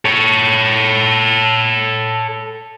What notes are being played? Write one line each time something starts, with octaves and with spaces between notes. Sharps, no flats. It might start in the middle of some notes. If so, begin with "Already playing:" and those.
A4 C#5